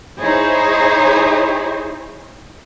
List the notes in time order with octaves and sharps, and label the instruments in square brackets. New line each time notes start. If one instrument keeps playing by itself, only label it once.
[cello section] D#4 E4 G#4 C5 C#5